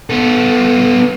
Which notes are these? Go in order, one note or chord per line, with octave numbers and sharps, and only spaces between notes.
B3 A4